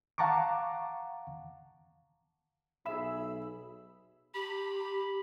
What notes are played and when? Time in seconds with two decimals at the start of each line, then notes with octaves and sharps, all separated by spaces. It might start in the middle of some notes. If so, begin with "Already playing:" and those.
0.18 F5 F#5 A5 A#5 C#6 D6
2.86 B1 G#4 E5 B5 E6
4.34 G4 B5